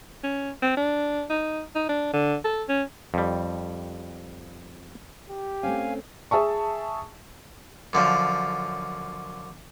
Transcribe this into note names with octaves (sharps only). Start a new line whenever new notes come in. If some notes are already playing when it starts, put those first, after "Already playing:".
C#4
C4
D4
D#4
D#4
D4
D3
A4
C#4
F2 G3
G4
A3 C4 C#4 F5 G#5
G#4 E5 A5 C#6
F#2 D3 F3